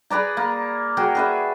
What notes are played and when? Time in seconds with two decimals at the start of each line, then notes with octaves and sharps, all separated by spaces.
0.10 G#4 B4 D5 A#5
0.37 A#3
0.97 F#4 G#4 A#4 G5
1.15 G#4 B4 E5